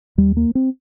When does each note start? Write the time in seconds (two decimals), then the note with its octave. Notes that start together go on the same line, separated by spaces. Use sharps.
0.18 D#2 G3
0.37 A#3
0.55 C4